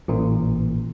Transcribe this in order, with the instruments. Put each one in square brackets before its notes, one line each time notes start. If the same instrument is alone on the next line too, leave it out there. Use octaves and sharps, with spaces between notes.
[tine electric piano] A1 A#2